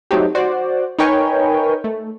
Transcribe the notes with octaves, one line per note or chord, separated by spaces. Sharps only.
F#3 A3 C4 D#4 G4
F#4 C5 D5
D#4 A#4 B4 C#5 G5 G#5
A3